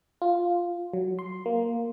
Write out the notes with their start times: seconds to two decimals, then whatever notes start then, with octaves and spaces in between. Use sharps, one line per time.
0.22 F4
0.93 F#3
1.19 C6
1.46 A#3